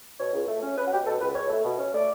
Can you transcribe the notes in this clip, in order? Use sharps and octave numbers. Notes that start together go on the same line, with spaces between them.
B2 C#5
C#2
A3
C#4
C#4 B4
F#4
B2 G4
B2 A4
C#2 B4
C#2 C#5
A3
B2
C#4
A3 D5